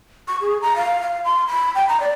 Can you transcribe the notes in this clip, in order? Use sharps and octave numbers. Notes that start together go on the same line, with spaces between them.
C#6
G#4
A#5
F5
F5
C6
B5
G5
A#5
D5